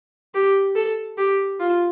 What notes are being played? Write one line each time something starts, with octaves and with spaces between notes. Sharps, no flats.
G4
A4
G4
F4